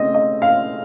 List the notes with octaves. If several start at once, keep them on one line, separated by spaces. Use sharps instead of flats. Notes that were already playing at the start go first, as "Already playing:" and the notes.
Already playing: C#3 A3 C4 D#5
D#5
F5